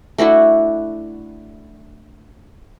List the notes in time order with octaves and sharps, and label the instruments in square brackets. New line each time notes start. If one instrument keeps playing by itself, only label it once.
[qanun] A3 D4 E4 F#4